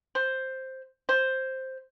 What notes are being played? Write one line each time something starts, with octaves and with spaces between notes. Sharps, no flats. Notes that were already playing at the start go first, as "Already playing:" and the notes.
C5
C5